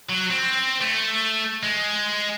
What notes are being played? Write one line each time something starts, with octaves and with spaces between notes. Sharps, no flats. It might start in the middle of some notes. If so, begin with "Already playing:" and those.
F#3
C4
A3
G#3